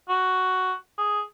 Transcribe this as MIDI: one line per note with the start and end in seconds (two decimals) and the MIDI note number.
0.09 0.74 66
0.98 1.21 68